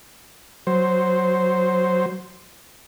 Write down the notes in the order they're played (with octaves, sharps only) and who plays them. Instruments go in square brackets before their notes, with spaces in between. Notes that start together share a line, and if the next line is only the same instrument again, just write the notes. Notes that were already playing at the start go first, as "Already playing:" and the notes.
[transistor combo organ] F#3 C5